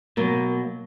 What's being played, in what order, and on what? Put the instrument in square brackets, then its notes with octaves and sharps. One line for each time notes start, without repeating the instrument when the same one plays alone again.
[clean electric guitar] B2 F#3 [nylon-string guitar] A#3